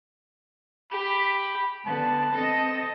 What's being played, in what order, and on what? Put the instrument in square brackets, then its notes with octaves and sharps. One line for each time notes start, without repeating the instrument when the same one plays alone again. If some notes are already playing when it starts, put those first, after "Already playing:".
[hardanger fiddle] G4 [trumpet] B5
[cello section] D3 [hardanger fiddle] B3 [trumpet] A5
[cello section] C4 D#5 [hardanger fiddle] A4